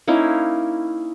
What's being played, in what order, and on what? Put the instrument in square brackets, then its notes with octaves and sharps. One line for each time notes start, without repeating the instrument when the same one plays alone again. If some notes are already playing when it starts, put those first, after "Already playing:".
[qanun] A#3 C#4 D#4 E4